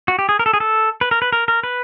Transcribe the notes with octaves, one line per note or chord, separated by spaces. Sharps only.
F#4
G4
G#4
A#4
A4
G#4
A4
B4
A#4
B4
A#4
A#4
B4